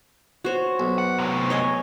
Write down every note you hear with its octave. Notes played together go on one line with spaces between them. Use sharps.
F#4 C5 C#5
B1
F#5
A2 C3
C#5 D#5 G#5